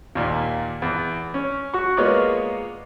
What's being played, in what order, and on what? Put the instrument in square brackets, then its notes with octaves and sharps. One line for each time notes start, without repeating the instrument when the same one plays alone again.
[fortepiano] D#2 A#2
E2
C#4
F#4 C#6
G#3 A#3 B3 F4 C#5 D5